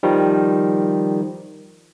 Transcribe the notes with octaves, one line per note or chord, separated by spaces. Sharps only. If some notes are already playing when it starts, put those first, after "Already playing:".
D#3 F3 G3